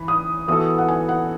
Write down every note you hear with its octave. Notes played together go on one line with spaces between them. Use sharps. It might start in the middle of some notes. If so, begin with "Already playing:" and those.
Already playing: E3 B5
D#6
E3 B3 F#4 A4 D#6
F#5
G#5
F#5